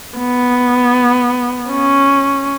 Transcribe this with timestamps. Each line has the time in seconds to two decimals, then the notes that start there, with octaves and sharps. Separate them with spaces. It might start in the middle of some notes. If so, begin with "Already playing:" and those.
0.18 B3
1.70 C#4